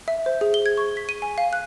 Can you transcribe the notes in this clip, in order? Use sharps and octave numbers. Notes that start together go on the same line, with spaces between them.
E5
C5
G#4
G7
G#6
C#6
B6
D#7
G#5
F5
F#6